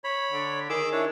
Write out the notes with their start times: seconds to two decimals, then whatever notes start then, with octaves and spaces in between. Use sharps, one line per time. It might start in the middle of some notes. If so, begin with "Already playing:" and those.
0.04 C#5 B5
0.32 D3
0.70 D#3 G#4 D6 E6
0.92 D4 E4 C#5